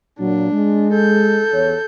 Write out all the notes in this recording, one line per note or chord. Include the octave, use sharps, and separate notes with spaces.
A#2 F#3 D4
G#3
A4 G6
E2 C#5